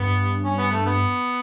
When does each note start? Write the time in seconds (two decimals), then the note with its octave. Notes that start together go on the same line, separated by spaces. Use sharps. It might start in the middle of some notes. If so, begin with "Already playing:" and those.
Already playing: G2 B3
0.43 C#4
0.57 B3
0.71 A3
0.86 B3